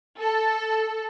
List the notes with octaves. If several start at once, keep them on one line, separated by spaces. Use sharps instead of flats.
A4